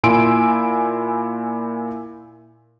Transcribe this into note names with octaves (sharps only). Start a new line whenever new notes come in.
A#2 E4 G#5 C6 E6 D7